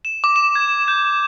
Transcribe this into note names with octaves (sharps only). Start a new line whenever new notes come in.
E7
D6
E7
G#6
G6